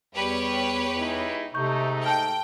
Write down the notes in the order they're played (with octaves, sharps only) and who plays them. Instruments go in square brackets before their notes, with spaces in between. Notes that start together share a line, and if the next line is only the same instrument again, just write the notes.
[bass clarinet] E2 [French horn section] G3 [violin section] G4 B4 C#5
[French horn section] G#3 D#4 E4
[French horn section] G#2 A3 D#4 [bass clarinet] C3 [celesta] C#6 G6
[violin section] G5 [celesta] A5 F6 G6